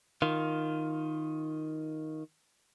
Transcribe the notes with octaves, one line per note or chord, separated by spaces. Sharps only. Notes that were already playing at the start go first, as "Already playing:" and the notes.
D#3 F4